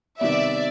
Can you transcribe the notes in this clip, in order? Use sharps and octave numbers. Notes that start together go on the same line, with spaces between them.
C3 D#3 G3 B3 D5 E5